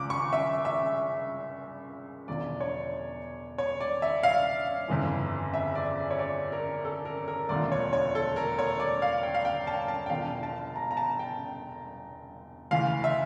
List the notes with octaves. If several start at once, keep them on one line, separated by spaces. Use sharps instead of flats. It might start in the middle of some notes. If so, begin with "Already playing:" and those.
Already playing: C#2 C#3 F3 D6
C#6
E5
E5
E1 E2 D3 F3 D5
C#5
C#5
D5
E5
F5
G1 F2 C#3 E3
E5
D5
C#5
D5
A#4
A4
A#4
A#4
E1 D2 D3 F3 D5
C#5
C#5
A4
A#4
C#5
D5
F5
G5
F5
G5
A5
A5
G5
E1 E2 D3 F3 F5
A5
A#5
A#5
A5
G5
D2 C#3 E3 F5
E5